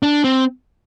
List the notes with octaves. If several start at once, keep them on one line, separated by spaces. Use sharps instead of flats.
D4
C4